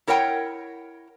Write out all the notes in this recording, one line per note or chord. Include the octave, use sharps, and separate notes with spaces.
E4 A#4 C#5 F#5 G5